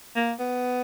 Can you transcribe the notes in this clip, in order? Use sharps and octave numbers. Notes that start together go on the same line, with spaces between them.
A#3
B3